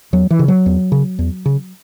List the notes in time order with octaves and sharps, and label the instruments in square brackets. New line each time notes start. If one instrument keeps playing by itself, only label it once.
[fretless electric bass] E2 F#3
E3
C#3
F#3
E2
C#3
E2
C#3